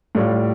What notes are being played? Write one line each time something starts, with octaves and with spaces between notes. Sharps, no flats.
A2 G3 F4